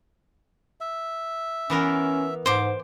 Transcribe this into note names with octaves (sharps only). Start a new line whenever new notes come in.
E5
E3 B3 C#4 A#4
G#2 C5 D6